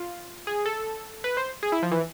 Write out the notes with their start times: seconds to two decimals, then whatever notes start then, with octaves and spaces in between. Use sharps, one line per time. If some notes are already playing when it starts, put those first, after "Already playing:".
Already playing: F4
0.47 G#4
0.66 A4
1.24 B4
1.37 C5
1.63 G#4
1.72 E4
1.82 F3
1.92 E3